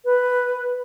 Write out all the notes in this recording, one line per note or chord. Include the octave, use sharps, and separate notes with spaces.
B4